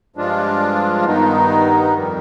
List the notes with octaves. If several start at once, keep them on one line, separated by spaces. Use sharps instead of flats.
G2 F3 G#3 D4 F4
G2 D#3 B3 D#4
F2 D#3 G3